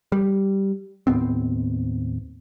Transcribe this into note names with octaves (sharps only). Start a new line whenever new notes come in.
G3
D#2 A2 B3 C4